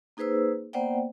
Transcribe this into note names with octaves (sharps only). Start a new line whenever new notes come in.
A#3 D#4 G#4 B4 C5 E6
A#3 B3 C5 D5 F#5 G5